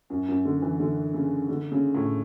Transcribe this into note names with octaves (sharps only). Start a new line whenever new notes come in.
F#2
F#2
D3
E3
D3
C#3
D3
C#3
A2